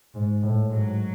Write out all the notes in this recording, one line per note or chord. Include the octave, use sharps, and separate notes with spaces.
G#2
A2
G#2 F#3